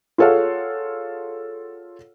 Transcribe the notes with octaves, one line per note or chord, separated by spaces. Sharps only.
F4 G#4 A4 C#5 F5 F#5